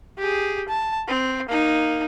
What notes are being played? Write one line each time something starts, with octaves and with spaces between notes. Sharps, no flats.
G4 G#4
A5
C4
A#3 D#4